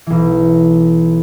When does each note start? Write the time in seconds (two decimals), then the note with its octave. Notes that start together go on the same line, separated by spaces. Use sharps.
0.06 B1 E3